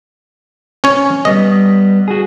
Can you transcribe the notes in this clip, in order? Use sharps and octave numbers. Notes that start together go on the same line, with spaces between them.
C#4 C#5
G3 B3 D#5
F#4 G#4